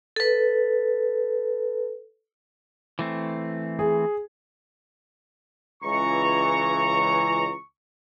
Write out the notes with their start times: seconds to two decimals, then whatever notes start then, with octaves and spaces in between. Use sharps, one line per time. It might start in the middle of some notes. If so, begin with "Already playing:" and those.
0.16 A4 B4
2.99 E3 A3 C4
3.79 G#4
5.83 C#2 E3 A#5 C#6